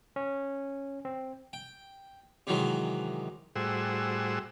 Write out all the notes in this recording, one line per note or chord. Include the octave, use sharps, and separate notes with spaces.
C#4
C4
G5
C3 D#3 E3 F#3 G#3
A2 G3 F#4 G#4 C5 E6